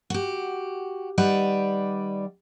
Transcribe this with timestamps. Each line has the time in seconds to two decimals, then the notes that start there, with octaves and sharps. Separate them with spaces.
0.10 F#4 G4
1.18 D#3 G3 B4 D5 F#5